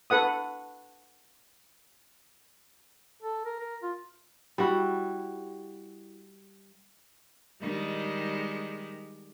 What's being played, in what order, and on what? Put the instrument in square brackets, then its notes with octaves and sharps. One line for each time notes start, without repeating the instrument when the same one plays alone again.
[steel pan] A4 B4 F#5 D#6
[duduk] A4
A#4
A#4
F4
[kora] G3 E4 F#4
[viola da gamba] D#3 G3 G#3